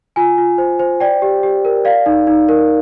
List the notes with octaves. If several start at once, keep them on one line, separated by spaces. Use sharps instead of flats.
F4 G#5
F4
C5
C5
D5 G5
G4
G4
A#4
D5 F5
D#4
D#4
A#4